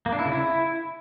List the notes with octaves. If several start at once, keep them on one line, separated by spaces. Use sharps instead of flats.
A#3
D4
E4
C#3
E4